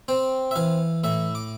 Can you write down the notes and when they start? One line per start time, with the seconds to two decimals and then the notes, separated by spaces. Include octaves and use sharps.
0.08 C4 G5
0.51 E5
0.56 E3 F5
1.04 A2 E5
1.35 D6